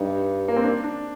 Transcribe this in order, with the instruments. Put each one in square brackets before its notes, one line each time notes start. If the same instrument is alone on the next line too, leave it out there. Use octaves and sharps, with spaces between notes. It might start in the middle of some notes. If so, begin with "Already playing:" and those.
Already playing: [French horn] G2 [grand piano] D#4
[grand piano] A#3
C4
D4
D4